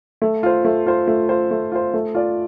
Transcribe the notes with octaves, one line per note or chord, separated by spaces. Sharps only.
A3
F4 C5
A3
F4 C5
A3
F4 C5
A3
F4 C5
A3
F4 D5